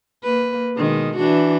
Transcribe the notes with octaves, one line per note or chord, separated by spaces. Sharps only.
A#3 B4
B2 D#3 G#3
E3 D4 F#4